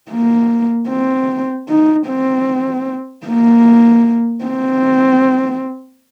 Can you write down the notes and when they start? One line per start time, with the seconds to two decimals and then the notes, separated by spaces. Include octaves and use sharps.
0.10 A#3
0.88 C4
1.69 D#4
2.08 C4
3.27 A#3
4.44 C4